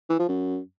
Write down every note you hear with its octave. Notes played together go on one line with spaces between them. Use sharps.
E3
F3
F#2